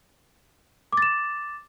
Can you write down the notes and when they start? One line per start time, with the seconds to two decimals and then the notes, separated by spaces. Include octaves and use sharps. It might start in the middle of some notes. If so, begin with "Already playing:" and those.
0.93 D6
0.97 A6
1.02 E7